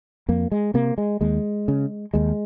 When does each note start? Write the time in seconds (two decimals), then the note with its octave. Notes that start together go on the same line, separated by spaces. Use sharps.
0.29 F2 A#3
0.52 G#3
0.74 C3 A#3
0.98 G#3
1.21 D#2 G#3
1.68 C#3
2.14 D#2 G#3